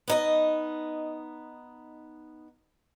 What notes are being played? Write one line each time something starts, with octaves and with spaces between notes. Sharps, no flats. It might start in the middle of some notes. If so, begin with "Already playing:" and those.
B3 D#4 D#5